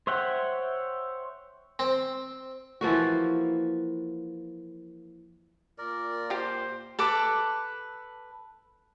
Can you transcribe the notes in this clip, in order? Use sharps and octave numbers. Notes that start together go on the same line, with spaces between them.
C5 C#5 E5 F#5 G5
C4
E3 F3 A#3 F#4
A#2 A#4 D5
F4 G4 C5
A4 B4 D6